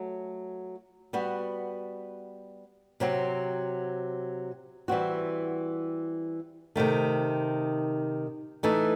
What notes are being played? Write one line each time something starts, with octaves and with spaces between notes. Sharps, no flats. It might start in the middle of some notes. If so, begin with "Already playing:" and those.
Already playing: F#3 A3
G3 B3 F#4
C3 F#3 C4
E3 G3 C4 F#4
C3 D#3 A3
E3 A3 D#4 A4